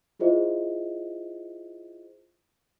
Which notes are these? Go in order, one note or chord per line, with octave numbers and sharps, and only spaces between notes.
E4 F4 G#4 C5 D#5 E5